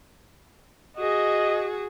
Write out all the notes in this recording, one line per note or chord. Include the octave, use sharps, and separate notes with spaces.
F#4 G#4 D#5